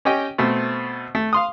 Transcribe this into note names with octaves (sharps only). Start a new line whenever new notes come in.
C#4 G4 D#5 G5
B2 A3 C4
A3
F5 C6 D#6